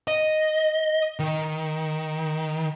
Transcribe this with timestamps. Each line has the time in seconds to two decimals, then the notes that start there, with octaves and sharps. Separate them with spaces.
0.08 D#5
1.19 D#3